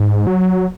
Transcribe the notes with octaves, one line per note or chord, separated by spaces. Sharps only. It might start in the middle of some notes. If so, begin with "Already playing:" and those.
Already playing: G#2
F#3